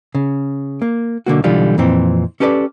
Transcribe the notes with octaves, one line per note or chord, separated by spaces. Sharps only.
C#3
A#3
B1 D3 A#3 F#4
B1 D3 E3 G3 F4
F2 A#2 E3 C4
C#4 G4 A4 B4 C#5 D5